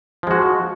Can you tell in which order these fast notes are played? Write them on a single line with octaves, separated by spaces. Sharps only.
F3 G#3 F#4